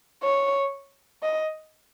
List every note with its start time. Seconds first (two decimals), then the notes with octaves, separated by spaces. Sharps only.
0.23 C#5
1.23 D#5